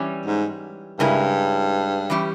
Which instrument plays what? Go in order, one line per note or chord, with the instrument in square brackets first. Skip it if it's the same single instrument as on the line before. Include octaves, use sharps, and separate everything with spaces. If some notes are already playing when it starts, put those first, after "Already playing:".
Already playing: [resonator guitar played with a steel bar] E3 G3 C#4
[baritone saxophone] G#2
[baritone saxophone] G2 [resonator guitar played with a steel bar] C#3 G#3 C#4 E4 A#4
[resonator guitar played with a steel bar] E3 G3 C#4 G4